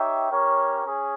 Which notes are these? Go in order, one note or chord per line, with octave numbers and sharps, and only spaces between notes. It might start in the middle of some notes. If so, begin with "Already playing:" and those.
Already playing: D#4 G4 C#5 E5 G5
C#4 G4 A#4 C#5
C#4 G#4